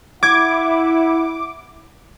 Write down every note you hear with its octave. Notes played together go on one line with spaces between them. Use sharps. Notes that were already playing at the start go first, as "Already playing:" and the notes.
E4 F#5 D6 G#6